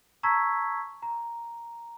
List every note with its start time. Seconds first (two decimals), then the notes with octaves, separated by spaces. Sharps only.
0.23 A5 A#5 C#6 E6 G#6 B6
1.02 A#5